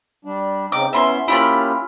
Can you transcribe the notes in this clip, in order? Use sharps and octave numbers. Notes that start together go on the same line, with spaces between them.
G3 D4
C#3 C4 D#4 D6
B3 C#4 E4 E5 B5 C6
A#3 C#4 E4 F4 G4 B5